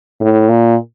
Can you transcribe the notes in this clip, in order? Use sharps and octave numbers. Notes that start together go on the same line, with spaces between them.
A2
A#2